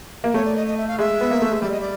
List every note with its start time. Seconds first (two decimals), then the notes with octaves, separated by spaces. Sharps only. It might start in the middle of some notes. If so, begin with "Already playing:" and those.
0.24 A#3
0.34 A3 C#5
0.45 D5
0.56 D#5
0.67 D#5
0.77 E5
0.88 F5
0.99 G#3 E5
1.21 B3
1.31 A#3
1.42 A3
1.52 G#3
1.62 G3 D5
1.71 D#5
1.80 D5